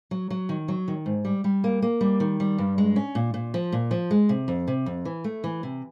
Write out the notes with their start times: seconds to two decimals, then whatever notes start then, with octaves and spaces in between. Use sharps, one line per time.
0.11 F#3
0.30 F#3
0.49 D#3
0.68 F#3
0.88 D#3
1.06 G#2
1.25 G3
1.44 G3
1.64 A#3
1.82 A#3
2.01 G3
2.20 D#3
2.40 G3
2.58 G2
2.78 G#3
2.96 C#4
3.15 A#2
3.34 A#2
3.54 F3
3.72 A#2
3.91 F3
4.11 G#3
4.29 C3
4.48 F2
4.68 C3
4.86 F2
5.05 E3
5.24 A3
5.44 E3
5.63 C3